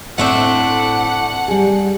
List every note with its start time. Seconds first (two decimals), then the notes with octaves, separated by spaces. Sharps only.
0.18 A2 A3 C4 D4 E5 F#5
1.48 G3 G#4